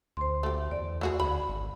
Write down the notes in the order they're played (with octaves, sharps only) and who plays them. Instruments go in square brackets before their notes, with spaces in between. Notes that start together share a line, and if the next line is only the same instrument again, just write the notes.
[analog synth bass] D2 [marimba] C5 C6
[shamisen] A3 G4
[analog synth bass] E2 [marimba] D5
[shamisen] A3 F#4 G#4
[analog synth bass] D2 [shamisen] B5
[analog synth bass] G#1